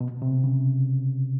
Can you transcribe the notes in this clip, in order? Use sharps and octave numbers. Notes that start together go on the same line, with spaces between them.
B2
C3
C#3